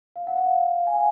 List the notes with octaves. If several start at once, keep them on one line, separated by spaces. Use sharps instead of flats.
F5
F#5
F5
G#5
F#5